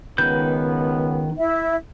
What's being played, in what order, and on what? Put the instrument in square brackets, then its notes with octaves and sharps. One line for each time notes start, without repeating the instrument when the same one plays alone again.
[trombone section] C#2 B3 [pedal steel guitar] D#3 B4 G6
[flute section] E4 E5